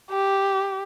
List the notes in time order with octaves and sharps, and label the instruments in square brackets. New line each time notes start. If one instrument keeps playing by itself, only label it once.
[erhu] G4